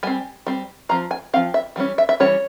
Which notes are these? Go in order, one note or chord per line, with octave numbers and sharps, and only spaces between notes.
G3 C4 G#5
G3 C4
F3 C4 A#5
G#5
F3 C4 F5
E5
E3 G3 C#4
E5
E5
E3 G3 C#4 C#5